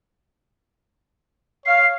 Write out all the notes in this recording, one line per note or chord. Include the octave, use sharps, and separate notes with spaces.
C#5 F5 C7